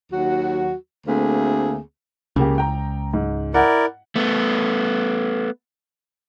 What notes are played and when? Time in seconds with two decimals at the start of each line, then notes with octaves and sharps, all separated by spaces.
0.11 D#2 F#3 F#4
1.07 D2 A3 A#3 C4 G#4
2.36 C#2 C#3 A#3 G4
2.58 G5 A#5
3.13 G#2
3.54 E4 A#4 D5 F#5
4.16 A3 B3